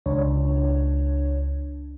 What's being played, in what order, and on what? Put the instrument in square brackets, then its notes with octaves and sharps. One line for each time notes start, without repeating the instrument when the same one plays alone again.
[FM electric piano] C#2 D4 C#5